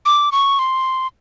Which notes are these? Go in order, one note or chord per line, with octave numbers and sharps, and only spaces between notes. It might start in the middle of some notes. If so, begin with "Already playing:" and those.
D6
C#6
C6